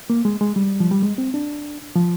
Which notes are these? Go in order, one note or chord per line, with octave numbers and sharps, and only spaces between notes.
A#3
G#3
G#3
G3
F3
G3
G#3
C4
D4
F3